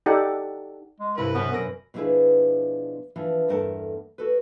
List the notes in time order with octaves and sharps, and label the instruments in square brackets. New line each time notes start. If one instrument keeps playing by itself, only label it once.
[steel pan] D#4 G4 A4 D5 F#5
[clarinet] G#3
[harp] C2 G2 C3 [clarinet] E4 [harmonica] B4
[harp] F#2 B2 C4 [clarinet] B3
[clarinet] A#4 [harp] E6 A#6 D7
[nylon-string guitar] B2 F3 D4 E4 G#4 B4
E3 F3 B3 D4
E2 G2 A3 A#4 F#5 A5
F#4 A4 B4